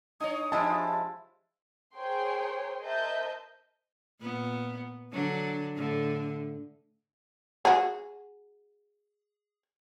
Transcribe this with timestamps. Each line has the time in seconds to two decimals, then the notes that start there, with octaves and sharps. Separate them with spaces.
0.20 D4 C#5 D#5 G#5 D#6
0.52 F3 G#3 D4 E4 F4 G4 G#5 A5
1.96 G#4 A#4 C5 C#5 G5 C6
2.82 A#4 C5 D#5 E5 A5 G6
4.20 A#2 B3
5.12 D3 F#3 D4
5.76 A2 D3
7.65 F#4 G#4